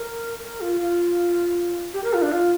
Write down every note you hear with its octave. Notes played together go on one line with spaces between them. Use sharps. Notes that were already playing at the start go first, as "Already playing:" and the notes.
Already playing: A#4
A#4
F4
F4
G4
A#4
F4
D4
F4